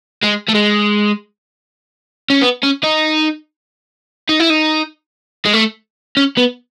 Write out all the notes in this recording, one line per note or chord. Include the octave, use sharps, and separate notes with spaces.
G#3
A3
G#3
C#4
B3
C#4
D#4
D#4
E4
D#4
G#3
A3
C#4
B3